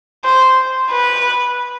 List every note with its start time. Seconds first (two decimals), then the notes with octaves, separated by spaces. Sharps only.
0.24 C5
0.91 B4